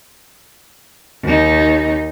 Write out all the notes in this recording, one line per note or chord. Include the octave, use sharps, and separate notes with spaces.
D#2 D#4